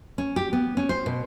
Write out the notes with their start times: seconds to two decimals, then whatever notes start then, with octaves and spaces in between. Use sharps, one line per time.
0.18 C#4
0.36 G4
0.53 B3
0.77 C#4
0.89 C5
1.06 B2